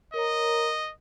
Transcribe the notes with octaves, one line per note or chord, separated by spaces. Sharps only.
A#4 C#5 D#5 A#5